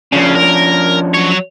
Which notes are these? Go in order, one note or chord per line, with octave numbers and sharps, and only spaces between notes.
C#3 F3 C#4 D4
A#4
F#3 C#5